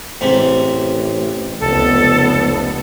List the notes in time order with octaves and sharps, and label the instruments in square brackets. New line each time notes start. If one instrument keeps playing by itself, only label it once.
[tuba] A1 [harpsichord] G#2 C3
[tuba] F1 [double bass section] C#2 B3 [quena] A4